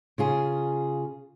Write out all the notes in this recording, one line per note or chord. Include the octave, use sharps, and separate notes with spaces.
C#3 F4 G#4